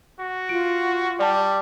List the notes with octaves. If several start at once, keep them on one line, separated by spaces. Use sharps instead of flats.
F#4
F4 D7
G3 D5 A5